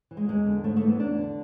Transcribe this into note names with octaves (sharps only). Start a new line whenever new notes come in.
E3
G#3
E2 G#3
D3
G#2 A3
A3
E3
B3
E2 D4
D3